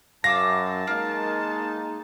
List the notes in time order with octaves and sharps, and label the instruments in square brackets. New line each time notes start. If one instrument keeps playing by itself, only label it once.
[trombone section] F#2 [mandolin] F5 D6 E6 [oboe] A5 [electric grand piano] A#6
[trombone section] G#3 A#3 D#4 [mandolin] A#4 F5